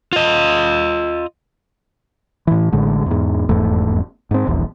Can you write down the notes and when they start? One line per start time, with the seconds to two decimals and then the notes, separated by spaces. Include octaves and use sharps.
0.13 F4 D#5
2.47 A2 E3
2.72 A1 A2 D3 G#3
3.06 E2 G#2
3.49 F1 E2 G#2 A3
4.31 G#2 C4
4.47 D#1 A#1 E2